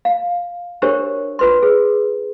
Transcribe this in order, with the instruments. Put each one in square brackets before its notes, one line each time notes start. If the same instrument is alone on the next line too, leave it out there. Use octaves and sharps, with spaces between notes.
[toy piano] F5
D4 F#4 G4 A#4 C5 C#5
F4 B4 C6
G#4